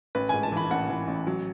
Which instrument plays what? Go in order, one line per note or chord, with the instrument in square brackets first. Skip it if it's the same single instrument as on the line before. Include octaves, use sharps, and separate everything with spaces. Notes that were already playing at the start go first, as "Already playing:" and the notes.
[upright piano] A1 B4
G#2 G#5
A5
E3 B5
A1 F#5
E3
A1
F#3